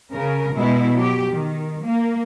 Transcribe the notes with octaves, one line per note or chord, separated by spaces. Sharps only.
C#3 A#4
B2 G#3 E4
F#3 G4
D#3
A#3